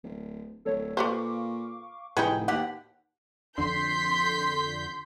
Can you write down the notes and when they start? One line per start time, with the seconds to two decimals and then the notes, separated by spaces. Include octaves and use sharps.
0.03 D1
0.65 D1 A4 C#5
0.97 A#2 A4 B4 C5 F5 C#6 D6
2.17 F1 A2 D#4 E4 G#4 B4 F#5 G5
2.48 D#2 B2 G4 F#5 B6
3.58 F2 D3 C6 G6 B6